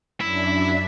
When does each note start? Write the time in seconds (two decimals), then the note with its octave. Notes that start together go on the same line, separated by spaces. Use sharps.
0.21 F#2 D4 E4 E5